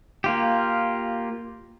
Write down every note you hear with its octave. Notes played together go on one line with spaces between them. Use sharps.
A#3 F4 G4